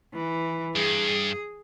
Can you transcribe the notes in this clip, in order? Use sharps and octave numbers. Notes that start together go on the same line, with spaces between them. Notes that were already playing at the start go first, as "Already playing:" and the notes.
E3
G2 G#4